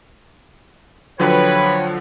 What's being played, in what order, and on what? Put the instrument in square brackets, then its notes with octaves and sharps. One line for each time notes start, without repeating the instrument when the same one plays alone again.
[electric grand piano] D3 F3 F#3 [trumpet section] B4 [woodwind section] C#5 [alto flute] G5